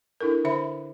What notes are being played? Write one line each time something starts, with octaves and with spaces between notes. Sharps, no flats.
D4 E4 A4 A#4
D3 C5 E5 B5